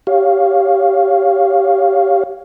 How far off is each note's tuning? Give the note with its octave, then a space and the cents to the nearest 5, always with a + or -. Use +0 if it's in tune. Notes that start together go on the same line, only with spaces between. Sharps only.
G4 +0 C#5 +0 F5 +0